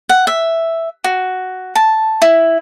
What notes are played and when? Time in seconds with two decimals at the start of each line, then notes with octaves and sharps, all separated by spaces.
0.09 F#5
0.27 E5
1.04 F#4
1.75 A5
2.22 E4